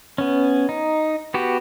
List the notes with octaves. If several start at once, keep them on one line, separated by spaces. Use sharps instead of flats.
B3 C#4
D#4
B3 F#4 G4